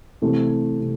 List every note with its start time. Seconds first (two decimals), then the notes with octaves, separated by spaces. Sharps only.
0.22 C3 E3 A3 C4
0.80 C3